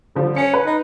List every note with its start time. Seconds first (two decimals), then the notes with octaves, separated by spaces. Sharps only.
0.15 D3 F3 G3
0.36 C#4 C#7
0.54 B4
0.66 D#4